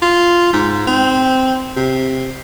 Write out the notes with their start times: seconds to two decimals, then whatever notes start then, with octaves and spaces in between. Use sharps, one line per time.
0.02 F4
0.53 G#2
0.87 C4
1.76 C3